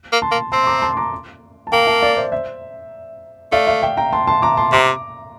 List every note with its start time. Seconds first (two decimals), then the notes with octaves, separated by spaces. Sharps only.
0.12 A#3
0.22 A5 C6
0.32 A#3
0.52 C4 A5 C6
0.67 A#5 D6
0.82 A5 C6
0.97 A#5 D6
1.67 A5
1.72 A#3 G5 A#5
1.87 F5 A5
2.02 D5 F5
2.17 C5 E5
2.32 C5 E5
3.52 A3 D5 F5
3.67 D5 F5
3.83 E5 G5
3.97 G5 A#5
4.13 A5 C6
4.27 A5 C6
4.42 A#5 D6
4.57 A5 C6
4.72 C3 A#5 D6